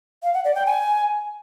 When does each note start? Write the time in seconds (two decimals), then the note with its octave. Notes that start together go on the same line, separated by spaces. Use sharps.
0.23 F5
0.34 F#5
0.45 D5
0.55 G5
0.66 G#5